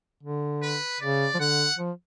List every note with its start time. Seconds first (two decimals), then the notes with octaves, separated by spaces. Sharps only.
0.23 D3
0.62 B4
1.01 C#3 D5
1.35 F3
1.39 D3 F#5
1.78 F3